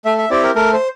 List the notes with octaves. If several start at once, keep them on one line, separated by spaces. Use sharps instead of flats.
A3 E5
E5
C4 E4 G4 D5
A#4
A3 A#4
C5